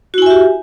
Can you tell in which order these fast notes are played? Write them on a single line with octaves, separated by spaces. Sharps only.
F#4 E4 G#5 E5 G4